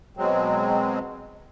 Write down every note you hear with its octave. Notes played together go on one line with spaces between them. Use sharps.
B2 F#3 G#3 C4